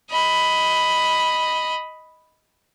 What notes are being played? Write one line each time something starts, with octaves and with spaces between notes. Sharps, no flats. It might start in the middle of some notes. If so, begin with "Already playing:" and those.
D#5 B5